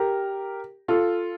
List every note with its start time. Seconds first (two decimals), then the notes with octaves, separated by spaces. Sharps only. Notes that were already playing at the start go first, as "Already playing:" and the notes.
Already playing: G4 A#4
0.88 F4 A4